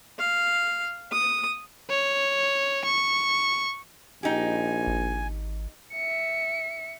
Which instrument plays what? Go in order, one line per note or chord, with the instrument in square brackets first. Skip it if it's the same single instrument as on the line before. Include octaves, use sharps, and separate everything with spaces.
[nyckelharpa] F5
D#6
[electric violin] C#5
C#6
[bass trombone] A#1 [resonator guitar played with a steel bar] D#4 G4 [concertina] G#5
[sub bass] G#1
[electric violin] E5 C#7